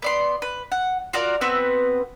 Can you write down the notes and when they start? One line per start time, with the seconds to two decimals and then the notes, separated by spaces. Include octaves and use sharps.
0.02 B3 D5 C6
0.42 B4
0.72 F#5
1.13 F4 F#4 A#4 D5
1.41 B3 C4 F#4 B4